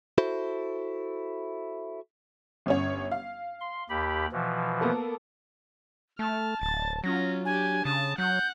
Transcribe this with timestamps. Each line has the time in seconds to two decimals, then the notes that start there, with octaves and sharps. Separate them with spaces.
0.18 E4 F#4 A4 C5
2.66 G1 C#4 C#5
3.11 F5
3.61 C6
3.89 D#2 G4 B5
4.32 B2 E3 F3
4.81 A#3 B3 A4
6.19 A3 A5 F6
6.61 D1 A6
7.04 F#3 C#4 F4 A#6
7.45 D4 G4 G#5
7.85 C#3 A5 D#6
8.18 F#3 F#5 G6